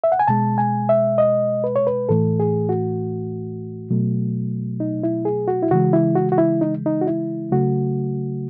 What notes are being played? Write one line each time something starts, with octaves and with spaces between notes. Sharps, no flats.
E5
F#5
G#5
B2 G#3 A5
G#5
E5
D#5
B4
C#5
B4
A2 E3 A3 A4
G#4
F#4
B2 F#3 A3
D#4
E4
G#4
F#4
E4
C#3 E3 G#3 F#4
E4
F#4
F#4
E4
D#4
D#4
F#4
E4
C#3 F#3 A3 F#4